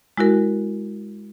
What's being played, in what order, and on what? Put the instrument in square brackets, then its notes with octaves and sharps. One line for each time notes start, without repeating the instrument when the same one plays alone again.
[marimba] G#3 E4 F#4 A#4